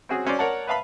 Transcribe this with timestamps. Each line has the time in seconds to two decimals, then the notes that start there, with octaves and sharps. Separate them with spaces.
0.09 C4 C#4 F#4 G#4
0.25 F#3 C#4 C5 D5
0.39 A#4 C#5 D5 F#5 A5
0.67 B4 E5 F5 A5 B5